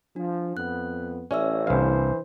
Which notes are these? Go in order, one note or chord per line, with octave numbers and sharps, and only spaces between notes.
F3 D4
F2 B3 F#6
A1 C#4 D5 E5 E6
C2 E3 D4 C5 F5